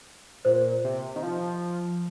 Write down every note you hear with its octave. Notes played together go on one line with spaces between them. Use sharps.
A#2 C5
C3
D#3
F3